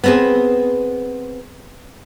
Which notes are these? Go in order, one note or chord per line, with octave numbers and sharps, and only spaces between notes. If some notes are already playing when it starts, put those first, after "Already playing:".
B3 C4 G#4